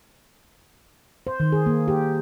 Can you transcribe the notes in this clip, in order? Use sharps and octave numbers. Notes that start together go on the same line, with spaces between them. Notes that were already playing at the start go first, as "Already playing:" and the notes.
C5
D#3
G#4
A#3
G4